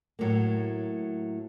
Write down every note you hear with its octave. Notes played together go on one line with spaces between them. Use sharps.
A2 F#3 A#3